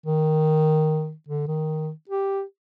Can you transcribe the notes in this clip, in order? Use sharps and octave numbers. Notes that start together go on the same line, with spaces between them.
D#3
D3
D#3
G4